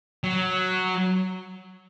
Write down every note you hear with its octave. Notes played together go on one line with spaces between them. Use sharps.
F#3